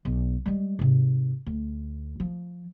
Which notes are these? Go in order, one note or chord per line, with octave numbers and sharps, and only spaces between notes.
B1
G3 G#3
G#2 C3
D2
F3